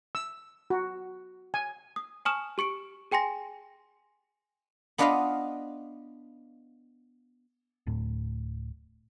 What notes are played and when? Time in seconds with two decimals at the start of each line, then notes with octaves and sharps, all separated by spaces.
0.15 E6
0.70 F#4
1.54 G#5
1.96 D#6
2.25 G#5 A5 C#6 D#6 F6 E7
2.58 G4 C#6 C#7 D7
3.11 G#4 G5 G#5 C6 A#6
4.98 B3 D4 F4 B4 D#5 F5
7.87 D1 A2